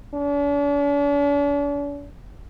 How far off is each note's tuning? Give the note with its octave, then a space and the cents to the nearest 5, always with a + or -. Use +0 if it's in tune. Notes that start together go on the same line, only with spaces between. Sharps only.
D4 -45